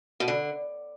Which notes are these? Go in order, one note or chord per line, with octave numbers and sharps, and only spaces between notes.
B2
D3